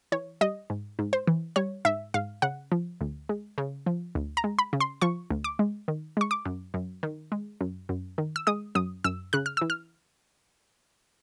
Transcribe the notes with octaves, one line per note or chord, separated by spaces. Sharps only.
E3 C#5
G3 D#5
G#2
G#2
C5
E3
G3 C#5
G#2 E5
G#2 F5
C#3 F#5
F3
D2
G#3
C#3
F3
D2
A#5
G#3
B5
C#3
C6
F3 C#6
D2
D6
G#3
D#3
G#3 C#6
D6
F#2
F#2
D#3
G#3
F#2
F#2
D#3
E6
G#3 D#6
F#2 D#6
F#2 E6
C#3 F#6
F6
E3 E6
F6